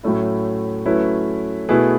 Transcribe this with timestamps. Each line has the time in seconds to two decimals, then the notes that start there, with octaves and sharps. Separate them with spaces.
0.03 A2 F#3 A3 C#4 E4
0.86 F#3 A3 C#4 E4 B4
1.69 B2 A3 E4 G#4 B4